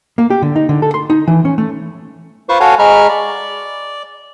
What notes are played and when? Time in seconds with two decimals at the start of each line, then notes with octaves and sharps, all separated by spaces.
0.18 A#3
0.30 G4
0.42 D3
0.56 D#4
0.69 D3
0.82 A4
0.94 C6
1.10 D#4
1.28 E3
1.45 C#4
1.58 A3
2.49 F4 B4 C5 C#6
2.60 F#4 A4 C#5 F5 F#5 G#5
2.79 G#3 G#4 A#5 B5 C#6 F6
3.09 D5